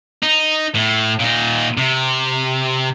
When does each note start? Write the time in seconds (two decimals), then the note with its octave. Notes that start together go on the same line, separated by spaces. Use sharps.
0.23 D#4
0.75 A2
1.20 A#2 D#4
1.77 C3